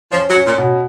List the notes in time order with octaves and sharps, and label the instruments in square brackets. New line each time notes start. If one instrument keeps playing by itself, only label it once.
[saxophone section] F3 [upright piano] C#4
[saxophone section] F#3
[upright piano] C#4
[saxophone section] A#2
[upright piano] B2